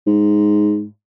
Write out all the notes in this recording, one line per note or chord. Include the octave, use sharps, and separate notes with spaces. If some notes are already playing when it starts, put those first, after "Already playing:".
G#2